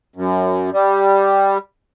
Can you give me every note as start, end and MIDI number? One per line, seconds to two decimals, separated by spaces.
0.16 0.70 42
0.73 1.58 55